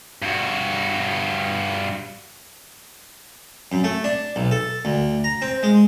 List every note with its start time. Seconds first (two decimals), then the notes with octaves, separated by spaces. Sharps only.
0.22 G2 F#4
3.72 F#2
3.84 A3
4.04 D4
4.36 B1
4.51 A4
4.85 D2
5.24 A#5
5.42 C4
5.63 G#3